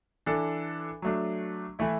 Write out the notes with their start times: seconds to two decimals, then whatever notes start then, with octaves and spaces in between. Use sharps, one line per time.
0.26 E3 D4 A4
1.02 F#3 A3 D4
1.79 E3 A3 E4